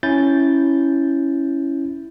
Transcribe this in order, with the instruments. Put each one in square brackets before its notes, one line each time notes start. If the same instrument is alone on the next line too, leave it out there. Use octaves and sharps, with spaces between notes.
[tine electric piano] C#4 E4 G6 A6